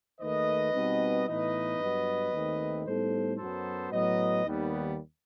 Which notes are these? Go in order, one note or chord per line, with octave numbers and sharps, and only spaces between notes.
D#2 D#3 A3 B4 D#5
B2 G3 C4 D#4
A2 E3 B3 D#4 B4 D#5
G2 F#3 B3
D#2 D#3 A3 C4
A2 G3 B3 D#4 A4 C5
F#2 F#3 B3 A4 C5
A2 F#3 B3 B4 D#5
D#2 D#3 G3 B3